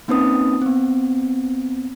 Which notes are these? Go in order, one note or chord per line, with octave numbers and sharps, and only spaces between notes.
A#3 C4 C#4 D#4 B4 D#6
B3 C4